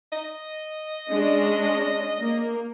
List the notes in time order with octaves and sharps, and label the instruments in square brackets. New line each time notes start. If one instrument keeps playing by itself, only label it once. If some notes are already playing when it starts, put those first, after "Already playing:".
[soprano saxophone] D#5
[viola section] G#3 C#4 D4
A#3